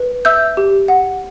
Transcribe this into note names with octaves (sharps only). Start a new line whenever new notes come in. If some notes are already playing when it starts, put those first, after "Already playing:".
Already playing: B4
E5 E6 G6
G4
F#5